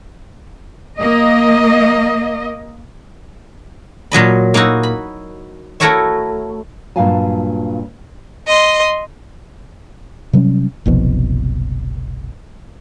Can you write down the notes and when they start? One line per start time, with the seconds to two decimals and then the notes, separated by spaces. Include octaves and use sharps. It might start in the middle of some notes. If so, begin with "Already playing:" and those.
1.00 A#3 D#5
4.11 A#2 F#3 D#5 B5
4.54 A#3 D#4 E4 F#4
4.83 B5
5.80 A3 E4 F#4 A#4 C#5 E5
6.96 G2 A#2 F#3 F5 G#5 A5
8.47 D#5 C6
10.33 C3 F#3 G3 C#4
10.86 F#1 C2 B2 F3